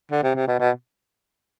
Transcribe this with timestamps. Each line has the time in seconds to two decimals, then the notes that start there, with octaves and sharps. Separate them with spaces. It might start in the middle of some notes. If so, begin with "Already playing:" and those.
0.11 D3
0.23 C3
0.35 C3
0.47 B2
0.60 B2